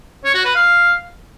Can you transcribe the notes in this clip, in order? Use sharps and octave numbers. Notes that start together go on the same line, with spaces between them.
C#5
F#4
B4
F5